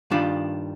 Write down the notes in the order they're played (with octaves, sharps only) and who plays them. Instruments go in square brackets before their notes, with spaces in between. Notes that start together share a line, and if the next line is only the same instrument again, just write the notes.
[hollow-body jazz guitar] G2 D#3 G3 D4 F4